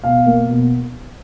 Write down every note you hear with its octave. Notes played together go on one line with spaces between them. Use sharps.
B2 F5
A#3
B2